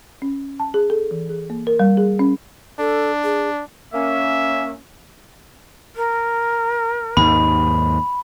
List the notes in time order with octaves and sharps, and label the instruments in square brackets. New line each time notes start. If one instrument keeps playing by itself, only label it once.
[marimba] C#4
A5
G#4
A4
E3
G#4
A#3
A#4
G3
G#4
C#4
[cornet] D4 [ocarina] A4
[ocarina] G#4
[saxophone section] A#3 C#4 [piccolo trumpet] E5
[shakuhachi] A#4
[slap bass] D#2 G#2 D#3 [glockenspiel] B5